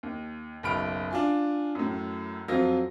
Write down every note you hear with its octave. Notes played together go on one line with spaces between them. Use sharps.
D#2
F#1 B1 B5 F6 D7
D4 F4 G#5
F#2 A2
F2 F3 F#3 F4 E6 A#6